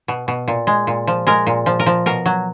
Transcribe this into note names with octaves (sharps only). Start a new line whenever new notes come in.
B2
B2
A#2
G#3
A#2
F3
G#3 A#4
A#2
F3
A#4
F3
B2 A#4
F#3